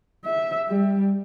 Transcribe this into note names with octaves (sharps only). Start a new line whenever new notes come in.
E5
G3